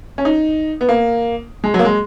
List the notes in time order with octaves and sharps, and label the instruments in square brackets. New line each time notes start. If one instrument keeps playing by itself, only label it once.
[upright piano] C#4
D#4
B3
A#3
G#3
F#3
A#3
G#3